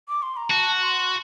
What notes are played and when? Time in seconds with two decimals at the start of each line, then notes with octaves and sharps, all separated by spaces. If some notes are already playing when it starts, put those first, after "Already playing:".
0.08 D6
0.22 C6
0.37 A#5
0.50 F#4 A5
0.82 C6